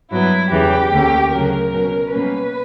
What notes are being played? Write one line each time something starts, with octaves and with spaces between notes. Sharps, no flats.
G2 F#3 B3 E4
E2 C#3 E3 G4
D2 D3 A#3 C#4
D2 C#3 F#3 A#3 A#4
B2 F#3 C#4
B2 G3 A#3 C#4 B4